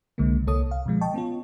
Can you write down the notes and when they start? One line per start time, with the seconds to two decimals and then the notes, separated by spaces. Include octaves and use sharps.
0.18 C2 D3 G#3 A#3
0.47 C2 A#3 A4 C#5 D#6
0.71 F5
0.86 B2 D3 F3 G#3
1.01 D#5 G5 A5 C#6
1.14 B3 C#4 F4